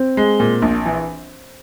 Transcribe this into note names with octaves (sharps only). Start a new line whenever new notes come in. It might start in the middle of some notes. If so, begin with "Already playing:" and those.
Already playing: C4
G#3
A#2
A#1
E3